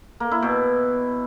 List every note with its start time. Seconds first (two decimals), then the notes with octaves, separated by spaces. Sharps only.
0.20 A#3
0.31 E4
0.42 B2